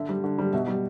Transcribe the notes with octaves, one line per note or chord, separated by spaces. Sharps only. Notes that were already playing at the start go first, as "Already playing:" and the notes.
Already playing: D3 E5
G3
D3
G3
B2 E5
G3